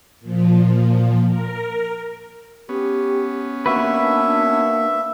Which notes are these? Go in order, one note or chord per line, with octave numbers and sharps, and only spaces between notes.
A#2 F3
A#4
B3 C#4 G4
A#3 D4 F#4 B4 E5